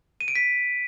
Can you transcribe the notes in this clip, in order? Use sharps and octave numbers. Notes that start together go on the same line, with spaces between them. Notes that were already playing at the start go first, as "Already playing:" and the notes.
D#7
D7
B6